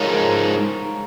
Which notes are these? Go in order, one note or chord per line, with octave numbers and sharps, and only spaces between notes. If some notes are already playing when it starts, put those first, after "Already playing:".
Already playing: G#2 F3 G#3 D#4 A#4 C#5 F5
A#4